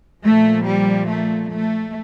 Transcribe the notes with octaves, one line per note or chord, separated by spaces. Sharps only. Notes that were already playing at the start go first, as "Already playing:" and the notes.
A#2 F3 A3
G3
A3
A3